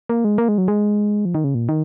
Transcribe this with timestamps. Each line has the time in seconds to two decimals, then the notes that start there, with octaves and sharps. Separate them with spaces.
0.09 A#3
0.24 G#3
0.38 A#3
0.48 G#3
0.58 F#3
0.68 G#3
1.25 F3
1.35 D#3
1.44 C#3
1.55 A#2
1.69 D#3